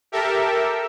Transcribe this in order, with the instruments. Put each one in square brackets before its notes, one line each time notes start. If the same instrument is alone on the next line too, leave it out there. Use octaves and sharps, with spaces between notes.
[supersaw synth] G4 A4 A#4 E5